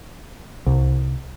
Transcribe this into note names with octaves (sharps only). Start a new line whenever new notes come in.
C2